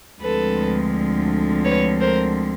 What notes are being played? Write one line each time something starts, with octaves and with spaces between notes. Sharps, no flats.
D2 D3 F3 G#3 C4 A4 B4
B4 C#5
A#4 C5